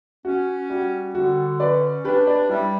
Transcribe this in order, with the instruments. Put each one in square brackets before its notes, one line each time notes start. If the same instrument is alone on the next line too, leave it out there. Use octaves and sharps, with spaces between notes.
[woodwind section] C#4 [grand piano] F#4
[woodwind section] G3 [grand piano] F#4
[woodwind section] D3 [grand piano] F#4
[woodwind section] C#4 [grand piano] B4 D5
[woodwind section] D4 [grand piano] G4 B4
[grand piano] B4 D5
[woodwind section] G3 [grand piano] E4